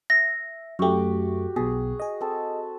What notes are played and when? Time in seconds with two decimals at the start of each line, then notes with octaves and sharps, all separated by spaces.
0.10 E5 A#6
0.79 F#2 A3 F#4 G4
1.56 B1 B2 G#4
2.00 G#4 D#5
2.21 C4 A4